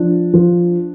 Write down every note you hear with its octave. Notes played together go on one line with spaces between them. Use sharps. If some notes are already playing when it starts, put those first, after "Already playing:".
Already playing: F3 D4
F3